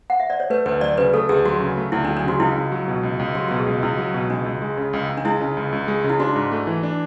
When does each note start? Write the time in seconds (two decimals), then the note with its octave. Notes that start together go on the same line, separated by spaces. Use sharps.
0.10 F#5
0.20 E5
0.30 D5
0.40 C#5
0.50 A3 B4
0.66 D2 B4
0.81 F#3 D5
0.98 C#3 B4
1.13 A3 A4
1.29 D2 G#4
1.45 F#3 F#4
1.60 C#3
1.77 A3
1.92 D2 E4
2.05 D4
2.09 F#3
2.17 D4
2.24 C#3 F#4
2.40 C#2 E4
2.56 C#2
2.72 F#3
2.88 B2
3.03 C#2
3.19 C#2
3.35 F#3 F#4
3.48 B2 F#4
3.59 G#4
3.66 C#2
3.83 C#2 E4
3.98 F#3
4.14 B2
4.30 C#2 D4
4.46 C#2
4.62 G#3
4.77 C#3
4.93 C#2
5.09 C#2
5.17 D4
5.25 G#3 E4
5.41 C#3
5.57 C#2
5.72 C#2
5.88 G#3
6.04 C#3
6.10 E4
6.20 D4 F#4
6.36 G#2
6.52 A3
6.67 E3
6.83 D4